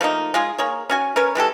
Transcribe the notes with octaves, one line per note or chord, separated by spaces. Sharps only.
F3 A3 A#3 D#4
G#3 F4 G#4
A#3 G#4 C#5
C#4 F#4 G#5
C#4 A#4 B4 C#5
E3 G#3 G4 A4